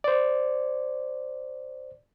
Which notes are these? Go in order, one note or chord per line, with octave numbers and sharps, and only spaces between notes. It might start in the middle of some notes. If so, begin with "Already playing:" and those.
C5 D5